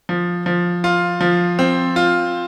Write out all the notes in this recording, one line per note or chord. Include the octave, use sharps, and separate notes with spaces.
F3
F3
F4
F3
C4
F4